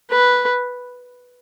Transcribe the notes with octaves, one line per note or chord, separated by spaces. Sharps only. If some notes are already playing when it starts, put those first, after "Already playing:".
B4